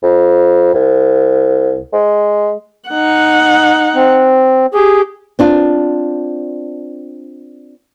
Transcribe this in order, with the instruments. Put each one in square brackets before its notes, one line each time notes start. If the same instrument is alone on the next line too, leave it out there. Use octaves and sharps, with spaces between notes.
[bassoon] F2
C2
G#3
[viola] D#4 F#5
[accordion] C4
[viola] G4 [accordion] G#4
[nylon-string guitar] C4 D4 F4